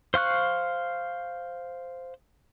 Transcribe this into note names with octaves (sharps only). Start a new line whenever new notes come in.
C5 F5 C#6 F#6